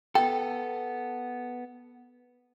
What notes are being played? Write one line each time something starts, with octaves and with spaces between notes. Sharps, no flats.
B3 A4 G5